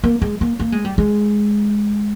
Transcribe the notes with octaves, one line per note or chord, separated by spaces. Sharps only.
A#3
G#3
A#3
A#3
G#3
G3
G#3